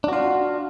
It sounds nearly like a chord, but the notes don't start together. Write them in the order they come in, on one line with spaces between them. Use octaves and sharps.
D4 F#4 F4